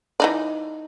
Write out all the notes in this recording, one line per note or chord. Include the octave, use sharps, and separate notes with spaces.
E3 D#4 D5